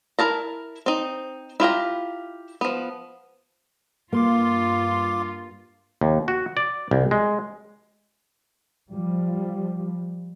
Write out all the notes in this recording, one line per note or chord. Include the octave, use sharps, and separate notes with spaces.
E4 A#4 A5 A#5
C4 D#4
E4 F4 G4 A#5
F3 B3
G2 A#3 F4 F5 C6 D6
D#2
F#4
D5
C2
G#3
F3 G3